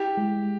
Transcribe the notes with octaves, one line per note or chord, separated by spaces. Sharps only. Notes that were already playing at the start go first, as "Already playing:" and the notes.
Already playing: E4 G4
G#3